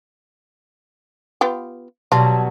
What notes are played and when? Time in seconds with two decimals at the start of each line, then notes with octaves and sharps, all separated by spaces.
1.41 B3 F4 G4
2.12 B2 F#3 G3 F4 A5